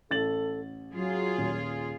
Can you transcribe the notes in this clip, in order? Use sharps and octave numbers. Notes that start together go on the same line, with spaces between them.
A1 A4 A6 F#7
F#3 F4 G#4
D#1